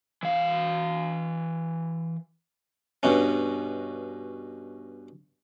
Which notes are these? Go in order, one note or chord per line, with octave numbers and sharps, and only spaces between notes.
E3 F5
G2 B2 C#4